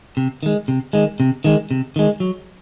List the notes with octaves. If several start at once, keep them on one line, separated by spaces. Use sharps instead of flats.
C3
D#3 G#3
C3
D#3 G#3
C3
D#3 G#3
C3
D#3 G#3
F#3